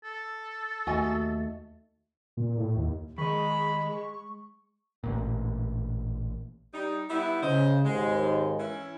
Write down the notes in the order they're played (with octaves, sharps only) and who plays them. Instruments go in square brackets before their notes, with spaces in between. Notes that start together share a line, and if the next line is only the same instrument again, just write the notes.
[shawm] A4
[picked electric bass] D#2 A3 [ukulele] F#4 D#5 G#5
[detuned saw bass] A#2
A2
D#2
[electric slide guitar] D#3 D#5 [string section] G#3 [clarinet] B5 [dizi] C#6
[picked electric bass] A1 A#2
[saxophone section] G3 D#4
G3 B3 E4
[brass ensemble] C#3 [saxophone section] C5 D#5
[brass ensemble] G#1 D#2 G#2 [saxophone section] G#3
[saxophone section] E3 C#4 E4